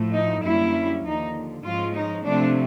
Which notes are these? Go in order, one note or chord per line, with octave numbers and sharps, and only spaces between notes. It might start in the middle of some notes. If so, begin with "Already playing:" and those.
Already playing: A2 F3 A3
D#4
F#2 D3 G3 A#3 C#4 E4
D#2 D3 F3 D#4
G#2 F3 G#3 C#4 F4
D#4
C3 F3 A3 C4 D4